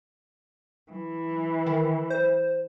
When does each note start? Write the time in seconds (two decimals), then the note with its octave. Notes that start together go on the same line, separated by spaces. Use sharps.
0.92 E3
1.66 D#3
2.10 C5